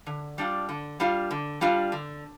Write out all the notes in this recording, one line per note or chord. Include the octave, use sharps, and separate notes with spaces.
D3
G3 D4 F4
D3
G3 D4 F4
D3
G3 D4 F4
D3